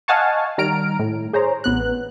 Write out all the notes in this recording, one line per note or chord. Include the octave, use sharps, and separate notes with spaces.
D#5 F5 F#5 G#5 A5 C#6
D#3 G3 A#5 F6 D7
A2
G#4 C5 C#5 A#5
A1 B3 F#6